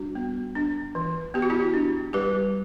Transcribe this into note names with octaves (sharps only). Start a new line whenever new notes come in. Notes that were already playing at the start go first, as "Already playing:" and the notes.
Already playing: G3 D4 F#4
B3
D4
E3
B3 G4
F#4
E4 G4
D4
G3 G4 B4